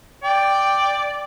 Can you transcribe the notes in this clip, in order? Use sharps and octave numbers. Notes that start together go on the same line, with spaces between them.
D5 G5